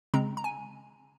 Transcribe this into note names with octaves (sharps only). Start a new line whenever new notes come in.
C#3 G#3 C4 A#5
A#5
G#5